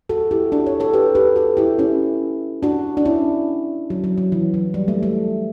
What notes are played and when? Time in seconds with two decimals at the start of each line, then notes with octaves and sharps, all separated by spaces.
0.09 F#4 A4
0.31 E4 G4
0.52 D4 F#4
0.66 A4 C#5
0.80 A4 C#5
0.94 G4 B4
1.15 G4 B4
1.36 F#4 A4
1.57 E4 G4
1.78 C#4 E4
2.63 D4 F#4
2.97 D4
3.05 C#4 E4
3.90 F#3
4.04 F#3
4.18 F#3
4.32 E3
4.54 F#3
4.74 G3
4.88 A3
5.03 A3